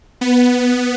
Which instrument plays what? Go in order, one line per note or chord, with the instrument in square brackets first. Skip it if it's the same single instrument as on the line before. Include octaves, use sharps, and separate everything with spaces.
[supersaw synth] B3